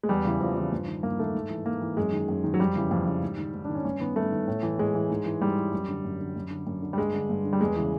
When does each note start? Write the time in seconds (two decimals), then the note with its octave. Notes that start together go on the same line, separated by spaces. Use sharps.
0.03 G#3
0.09 E2 G3
0.25 C#3 E3
0.40 E2 F3
0.56 C#3 E3
0.72 G2
0.87 D#3
1.03 G2 A#3
1.19 D#3 A3
1.34 G#2
1.50 E3
1.66 G#2 A#3
1.81 E3
1.97 F#2 G#3
2.12 D#3
2.29 F#2
2.44 D#3
2.54 F#3
2.59 F2 G3
2.76 C#3 E3
2.91 F2
3.06 C#3 E3
3.22 G#2
3.38 D#3
3.54 G#2
3.65 D#3 D4
3.75 C#4
3.85 G2 C#4
4.00 D#3 B3
4.16 G2 A3
4.32 D#3
4.48 A2
4.63 E3
4.78 A2 G#3
4.94 E3
5.10 G#2
5.26 E3
5.41 G#2 G3
5.57 E3
5.72 F#2
5.89 D3
6.04 F#2
6.20 D3
6.36 F#2
6.51 D3
6.67 F#2
6.82 D3
6.93 G3
6.98 G2 G#3
7.14 D3
7.29 G2
7.45 D3
7.53 G3
7.60 E2 G#3
7.76 C#3 E3